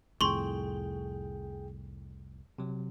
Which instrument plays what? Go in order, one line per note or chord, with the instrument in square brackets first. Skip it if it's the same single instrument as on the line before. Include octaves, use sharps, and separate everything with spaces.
[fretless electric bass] C2 F2 A2 [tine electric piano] G#4 G5 [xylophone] C6 C#6
[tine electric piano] C3 F#3